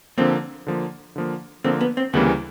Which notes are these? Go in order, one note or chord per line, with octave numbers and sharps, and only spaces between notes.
D3 F3 A#3 C4
D3 F3 A#3
D3 F3 A#3
D3 F3 A#3 C4
B3
C4
D2 C#3 E3 G3 A#3 B3